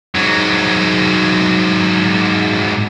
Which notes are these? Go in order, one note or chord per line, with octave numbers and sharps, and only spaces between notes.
G#2 F#3